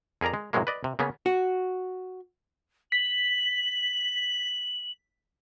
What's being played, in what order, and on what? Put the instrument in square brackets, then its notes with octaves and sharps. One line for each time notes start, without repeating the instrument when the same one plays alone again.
[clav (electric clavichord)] F2 G#4 A#4 D5 A#5
G#3
A2 C3 D#3 F#3 G#3 A#3
B4 D5 D#5
C3
C#3 A#3 B3 C#4
[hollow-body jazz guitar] F#4
[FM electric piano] B6 [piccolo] F#7